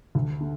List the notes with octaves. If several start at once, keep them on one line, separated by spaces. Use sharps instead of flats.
D2
D3